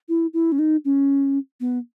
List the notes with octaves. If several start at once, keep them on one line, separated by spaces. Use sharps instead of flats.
E4
E4
C#4
D#4
C#4
B3